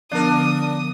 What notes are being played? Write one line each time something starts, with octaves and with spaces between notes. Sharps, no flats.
D3 F3 B3 D4 A#4 D#6